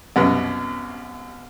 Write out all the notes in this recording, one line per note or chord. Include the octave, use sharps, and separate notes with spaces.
C2 F#2 B2